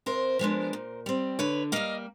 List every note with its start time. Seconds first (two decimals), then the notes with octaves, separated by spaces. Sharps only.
0.06 C3 A#4 C5
0.39 F3 G#3 B3 D4
0.73 A#2
1.06 G3 C4
1.39 D3 B4 C#5
1.72 G3 A#3 D#5 F5